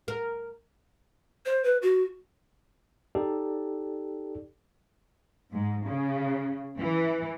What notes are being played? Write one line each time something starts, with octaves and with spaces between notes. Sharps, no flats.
A#4
C5
B4
F#4
D#4 G4 A4 D5
G#2
C#3
E3